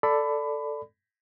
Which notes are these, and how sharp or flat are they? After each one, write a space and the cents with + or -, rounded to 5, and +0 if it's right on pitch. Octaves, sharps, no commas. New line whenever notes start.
A4 +5 D5 +0 B5 +20